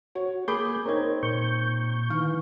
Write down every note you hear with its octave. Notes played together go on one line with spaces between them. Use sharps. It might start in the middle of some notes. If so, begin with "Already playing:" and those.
F#4 C#5
A#3 G#4 B5 D6 G6
C4 D#4 A#4 C#5 G#6
A#2 C#6 G6
D#3 E3 F5 C#6